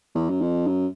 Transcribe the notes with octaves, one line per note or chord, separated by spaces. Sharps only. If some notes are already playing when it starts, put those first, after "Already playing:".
E2
F#2
F2
F#2